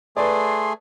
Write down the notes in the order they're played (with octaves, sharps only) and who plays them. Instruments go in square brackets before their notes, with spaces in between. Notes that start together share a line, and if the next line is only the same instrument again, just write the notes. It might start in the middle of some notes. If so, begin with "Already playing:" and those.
[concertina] A3 G#4 [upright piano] B4 D5 [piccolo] C6